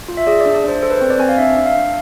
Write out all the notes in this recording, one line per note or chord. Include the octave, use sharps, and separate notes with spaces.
F4
E5
G#4 D5
D5
D4
D5
D4 C5
A4 C5
B4
C4 C5
D5
C4 G#5
F5
D4 E5
D4
F5
D4